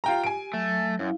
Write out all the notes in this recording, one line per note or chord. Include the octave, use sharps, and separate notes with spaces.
F4 G4 G5 A#5
G#5 D7
F#3 A3
F#2 E4 F5